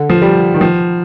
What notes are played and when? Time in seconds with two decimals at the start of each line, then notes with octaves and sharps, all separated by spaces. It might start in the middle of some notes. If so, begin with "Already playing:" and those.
Already playing: D3
0.10 F3
0.22 G3
0.54 D#3
0.61 F3